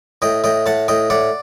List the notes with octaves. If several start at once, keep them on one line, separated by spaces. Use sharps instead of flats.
A2 D#5 G5
A2 D#5 G5
A2 F#5 A5
A2 D#5 G5
A2 D5 F#5